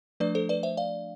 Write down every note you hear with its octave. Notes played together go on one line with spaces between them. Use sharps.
F3 A3 D4 B4 D5
A4 C5
B4 D5
C5 E5
D5 F5